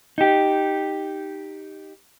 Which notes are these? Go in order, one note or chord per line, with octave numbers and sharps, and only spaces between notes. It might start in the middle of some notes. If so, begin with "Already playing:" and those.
D#4 G4